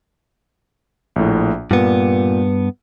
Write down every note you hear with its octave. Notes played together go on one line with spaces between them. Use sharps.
A#1 A2
G2 A#2 B3